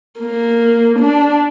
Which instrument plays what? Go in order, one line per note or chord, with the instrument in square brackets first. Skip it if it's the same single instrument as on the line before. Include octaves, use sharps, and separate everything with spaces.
[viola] A#3
D4